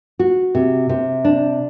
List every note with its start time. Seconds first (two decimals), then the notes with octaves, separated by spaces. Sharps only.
0.19 F#4
0.55 C3
0.89 C3
1.25 D4